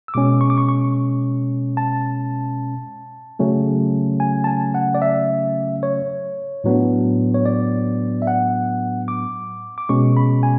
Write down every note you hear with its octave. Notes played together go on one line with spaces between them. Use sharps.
E6
B2 G#3 C#4 D6
C#6
D6
C#6
C#6
A5
C#3 F#3 A3 C#4
G#5
A5
G#5
F#5
D5
E5
C#5
A2 F#3 B3 D4
C#5
D5
E5
F#5
D6
D6
B2 G#3 C#4 C#6
B5
G#5